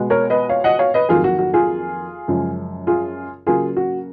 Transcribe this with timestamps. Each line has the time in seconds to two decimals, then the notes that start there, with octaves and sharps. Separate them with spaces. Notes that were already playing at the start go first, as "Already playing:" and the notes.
Already playing: B2 G#3 B3
0.10 A#4 C#5
0.30 B4 D#5
0.49 C#5 F5
0.64 D#5 F#5
0.79 C#5 F5
0.94 B4 D#5
1.09 F2 D#3 F#3 A#3 F4 G#4
1.24 F#4
1.39 F#4
1.54 F4 G#4
2.28 F#2 C#3 F3 G#3
2.87 F4 G#4
3.47 C#3 F#3 A#3 F4 G#4
3.77 F#4